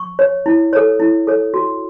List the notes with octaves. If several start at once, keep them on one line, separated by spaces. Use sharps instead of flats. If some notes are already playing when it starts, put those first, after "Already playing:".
Already playing: C#6
C#5
E4
A4 C#5
E4
A4 C#5
F#4